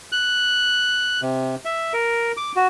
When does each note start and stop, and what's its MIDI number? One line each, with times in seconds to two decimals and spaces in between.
0.12 1.21 90
1.22 1.55 48
1.65 1.93 76
1.93 2.32 70
2.37 2.52 86
2.56 2.68 66